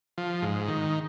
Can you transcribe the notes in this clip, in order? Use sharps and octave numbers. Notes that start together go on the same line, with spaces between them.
F3
G#2
D#3